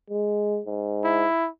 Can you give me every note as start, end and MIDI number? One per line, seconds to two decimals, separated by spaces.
0.10 0.61 56
0.66 1.26 44
1.04 1.49 64